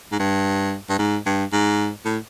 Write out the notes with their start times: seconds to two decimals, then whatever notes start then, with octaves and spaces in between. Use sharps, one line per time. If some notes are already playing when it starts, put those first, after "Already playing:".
0.12 G#2
0.19 G2
0.89 G2
0.99 G#2
1.26 G2
1.53 G#2
2.05 A2